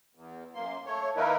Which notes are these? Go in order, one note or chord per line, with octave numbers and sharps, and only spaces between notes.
E2
F#2 A#3 C6
A3 C#5
D#3 A#3 D#4 E4 A#4 B4